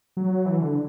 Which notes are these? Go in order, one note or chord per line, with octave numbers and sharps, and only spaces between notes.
F#3
E3
D3